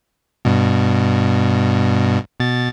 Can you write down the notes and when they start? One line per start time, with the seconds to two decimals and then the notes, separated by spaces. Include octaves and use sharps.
0.45 G2 B2
2.40 B2 A6